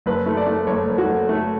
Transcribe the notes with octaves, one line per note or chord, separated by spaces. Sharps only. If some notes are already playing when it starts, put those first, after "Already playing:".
F#1 B4
A3
D5
A3
F#1 C#5
F#1
F#4
F#1
A3